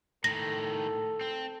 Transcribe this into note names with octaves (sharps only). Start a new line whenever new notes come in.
A2 D#3 A4 A#6
C4